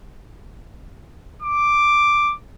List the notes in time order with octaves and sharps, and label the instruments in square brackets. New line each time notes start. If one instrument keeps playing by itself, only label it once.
[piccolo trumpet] D6